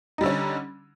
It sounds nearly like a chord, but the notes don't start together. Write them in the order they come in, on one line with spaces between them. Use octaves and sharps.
D#4 G3 D3 C#4